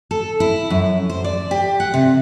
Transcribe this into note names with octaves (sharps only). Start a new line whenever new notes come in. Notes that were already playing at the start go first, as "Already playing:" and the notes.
A4
E4
F#2
C5
D5
G4
F#5
C3